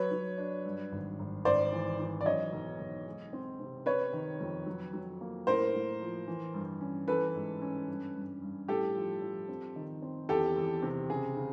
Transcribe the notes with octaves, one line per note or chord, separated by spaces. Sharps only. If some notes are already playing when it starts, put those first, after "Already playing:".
Already playing: F#3 B4 C#5
F#3
D4
G2
G#1
G#1
G#1 C5 D5
E3
E3
D5
F#3 C#5 D#5
B1
B1
G#3
C4
C3
C3 B4 C#5
D#3
F2
F#3
F#3
A#3
A2 A#4 C5
A2
F3
E3
G2
C#4
E3 A4 B4
G#2
C#4
G2
G2
G2
A2 G4 A4
F3
F3
C4
D#3
C4
E2 G4 A4
E2
C3
C#3 G#4
C#3